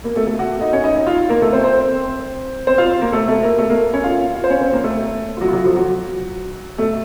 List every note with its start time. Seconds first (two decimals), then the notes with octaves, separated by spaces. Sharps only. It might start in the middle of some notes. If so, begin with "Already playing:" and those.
0.04 A#3 A#4
0.16 A3 A4
0.26 A3 A4
0.39 F#4 F#5
0.61 D#4 D#5
0.73 C#4 C#5
0.84 D#4 D#5
0.95 D#4 D#5
1.07 F4 F5
1.29 A#3 A#4
1.42 A3 A4
1.53 C4 C5
1.64 C4 C5
2.67 C4 C5
2.78 F4 F5
3.01 A#3 A#4
3.12 A3 A4
3.28 A3 A4
3.43 A#3 A#4
3.58 A3 A4
3.70 A#3 A#4
3.93 C#4 C#5
4.04 F4 F5
4.35 F4 F5
4.44 C5
4.50 C#4 C#5
4.61 C4 C5
4.73 A#3 A#4
4.84 A3 A4
5.37 F4
5.41 F#3 F#4
5.48 F4
5.53 F#3 F#4
5.64 F3 F4
5.76 F#3 F#4
6.78 A3 A4